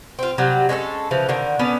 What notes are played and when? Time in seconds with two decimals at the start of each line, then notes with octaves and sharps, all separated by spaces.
0.19 C4 F4
0.38 C3 F#3 G3
0.69 G#3 C#4 D4 A4
1.11 C#3 E3 F3
1.29 D3 D#3
1.59 B3 C#4 A4 D5